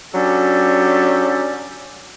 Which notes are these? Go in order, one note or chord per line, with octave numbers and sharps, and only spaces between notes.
F#3 C#4 D4 G4 A4 D5